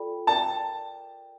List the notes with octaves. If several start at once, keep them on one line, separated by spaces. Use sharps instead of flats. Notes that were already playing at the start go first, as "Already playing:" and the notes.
Already playing: F4 A4 D5 G5 B5
A#4 D5 G5 A5